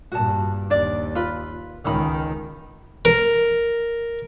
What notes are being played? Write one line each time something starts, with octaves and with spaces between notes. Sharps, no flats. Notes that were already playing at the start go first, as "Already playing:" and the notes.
G2 A#2 F#4 A5
D#2 D4 D5
F4 B4
C#2 D#3 C#4 D#4 B5
A#4